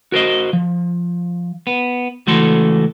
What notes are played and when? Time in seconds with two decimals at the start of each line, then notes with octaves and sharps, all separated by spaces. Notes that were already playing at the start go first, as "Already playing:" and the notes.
0.12 F#4 A#4 C5 D#5
0.53 F3
1.67 B3
2.27 C#2 E3 A3 F#4 A4 C6